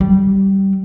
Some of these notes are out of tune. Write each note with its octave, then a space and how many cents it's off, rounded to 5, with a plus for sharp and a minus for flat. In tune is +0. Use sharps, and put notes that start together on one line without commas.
G3 -15